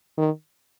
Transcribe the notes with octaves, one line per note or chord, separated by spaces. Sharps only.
D#3